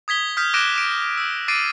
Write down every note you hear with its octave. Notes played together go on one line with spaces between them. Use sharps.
D#6 G#6 B6 G7
D#6 F6 G6 B6
D6 F#6 G6 A#6 D7 E7
D6 D7
E6
D6 A6 C7 D7 D#7